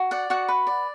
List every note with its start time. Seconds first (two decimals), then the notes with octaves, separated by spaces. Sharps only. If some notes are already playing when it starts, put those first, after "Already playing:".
Already playing: F#4
0.11 D5 F#5
0.30 F#4 F#5
0.48 B4
0.67 D5